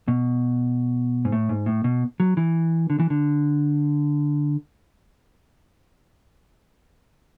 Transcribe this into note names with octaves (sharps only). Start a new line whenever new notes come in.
B2
G#2
A2
G#2
A2
B2
F#3
E3
D3
E3
D3